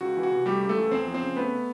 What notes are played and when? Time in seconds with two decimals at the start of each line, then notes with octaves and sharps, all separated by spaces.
0.01 C#2 F#4
0.17 E3
0.23 F#4
0.31 C3
0.46 G3 A3 G4
0.61 C#2
0.69 A3 A4
0.77 E3
0.91 E2 C4 C5
1.07 F3
1.14 C4 C5
1.22 C#3
1.36 A3 B3 B4